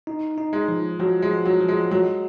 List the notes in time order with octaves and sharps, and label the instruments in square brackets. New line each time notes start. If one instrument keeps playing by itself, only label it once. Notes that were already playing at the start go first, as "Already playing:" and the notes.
[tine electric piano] D#4
D#4
[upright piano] G#3
[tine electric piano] F3
[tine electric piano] F3 [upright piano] F#3
[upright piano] G#3
[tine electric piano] F3
[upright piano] F#3
[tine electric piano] F3
[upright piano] G#3
[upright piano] F#3 [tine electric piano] G#3